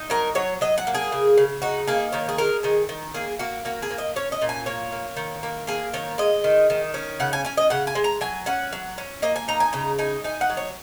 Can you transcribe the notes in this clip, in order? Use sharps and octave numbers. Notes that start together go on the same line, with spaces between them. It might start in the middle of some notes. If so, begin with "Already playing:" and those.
Already playing: D#4
F#3 A#4
F#3 C#5
F#3 D#5
F#5
A#3
G#4
C#3
C#3
D#4 F#4
A#3 G#4
D#3 C#5
G#4
G#3 A#4
D#3 G#4
D#3
A#3 G#4
A#3 F#4
A#3 F#4
G#4
A#3
D#5
C#4 C#5
D#5
A#2
G#5
A#3 C#5
A#3
D#3
A#3
A#3 G#4
D#3 C#5
G#3 D#5
D#3
D#3
C#4
C#3 F#5
G#5
C#4 G#5
D#5
C#3 F#5
G#5
G#3
A#5
F#3 G#5
C#4 F#5
F#3
C#4
A#3 D#5
G#5
D#4 A#5
G#5
C#3 A#5
D#4 G#5
D#4 G#5
F#5
F#3
C#5